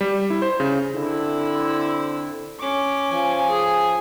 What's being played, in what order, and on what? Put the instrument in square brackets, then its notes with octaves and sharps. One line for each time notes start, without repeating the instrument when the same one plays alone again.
[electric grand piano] G3
E4
C5
C#3
[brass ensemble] D3 C4 E4
[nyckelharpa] C#4 D6
[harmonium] F3 G#5
[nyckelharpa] G#4